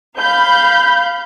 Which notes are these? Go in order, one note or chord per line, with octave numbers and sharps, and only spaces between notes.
F5 B5 G6